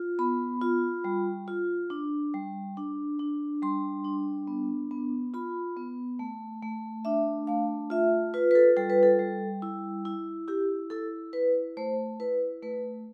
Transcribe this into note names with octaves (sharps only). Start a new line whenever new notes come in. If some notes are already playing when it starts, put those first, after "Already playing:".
Already playing: F4
B3 B5
F4
G3
F4
D4
G3
D4
D4
G3 C6
D4
B3
B3
F4 B5
B3
A3
A3
D4 E5
A3 F5
F4 E5
F4 B4
B4
A4
G3 A4
B4
A4
G3
E4
E4
E4 G4
E4 A4
E4 B4
A3 C5
E4 B4
A3 B4